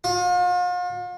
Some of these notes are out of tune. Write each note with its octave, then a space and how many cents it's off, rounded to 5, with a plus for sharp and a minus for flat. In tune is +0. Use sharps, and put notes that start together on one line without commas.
F4 +40